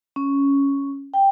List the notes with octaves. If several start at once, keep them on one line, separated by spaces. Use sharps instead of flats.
C#4
G5